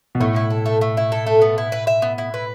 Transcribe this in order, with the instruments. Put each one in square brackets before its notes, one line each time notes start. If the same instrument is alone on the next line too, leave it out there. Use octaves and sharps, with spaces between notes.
[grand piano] B2
[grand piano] A2 [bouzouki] A3
[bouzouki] E4
A4
A3
A3
E4
A4
A3
B3
E4
B4
E5
B3
E4
B4